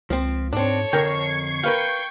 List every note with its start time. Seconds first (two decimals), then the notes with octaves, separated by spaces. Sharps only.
0.10 C#2 F3 C4
0.53 G#2 C4 D4 A4 C#5
0.93 F2 D3 A#4 G5 C#6 G#6 C7
1.64 A#4 B4 F5 G5 G6